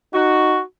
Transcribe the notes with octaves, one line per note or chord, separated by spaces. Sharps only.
D#4 F#4